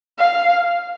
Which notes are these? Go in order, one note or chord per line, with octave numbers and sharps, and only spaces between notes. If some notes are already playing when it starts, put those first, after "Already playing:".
F5